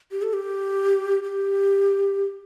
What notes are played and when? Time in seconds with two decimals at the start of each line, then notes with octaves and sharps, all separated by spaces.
0.11 G4
0.22 A4
0.33 G4
1.23 G4